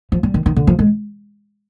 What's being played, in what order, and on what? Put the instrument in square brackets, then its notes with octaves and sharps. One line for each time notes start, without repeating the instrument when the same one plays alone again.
[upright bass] F3
G3
D#3
D#3
D3
F3
G#3